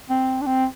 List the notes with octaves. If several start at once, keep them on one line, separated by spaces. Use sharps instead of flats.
C4
D4
C4